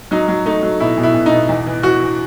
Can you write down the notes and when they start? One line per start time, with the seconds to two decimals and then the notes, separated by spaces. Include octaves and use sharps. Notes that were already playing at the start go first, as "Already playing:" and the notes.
0.11 F#3 D#4
0.28 F#3
0.45 A3 D#4
0.63 F#3
0.80 B2 E4
0.98 B2
1.03 E4
1.14 B2
1.26 D#4
1.31 B2
1.49 E2
1.66 E3
1.83 E3 F#4
2.00 E3